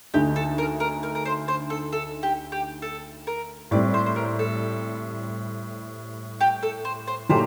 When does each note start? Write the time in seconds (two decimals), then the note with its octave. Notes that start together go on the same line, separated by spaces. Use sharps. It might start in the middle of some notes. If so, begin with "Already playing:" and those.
0.14 D2 D3 A3 D#4 G4
0.36 A4
0.58 A#4
0.80 A#4
1.03 A#4
1.15 A#4
1.25 C5
1.48 C5
1.70 A4
1.92 A4
2.23 G4
2.52 G4
2.82 A4
3.27 A#4
3.71 A2 G3 C4 D5
3.94 C5
4.06 C5
4.16 A#4
4.39 A4
6.41 G4
6.63 A4
6.85 C5
7.07 C5
7.29 A#2 F#3 A3 D#4 G4 C5